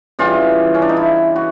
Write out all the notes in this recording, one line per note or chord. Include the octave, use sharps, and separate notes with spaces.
C#3 E3 G3 F4
C#4
D4
D#4
E4
F#4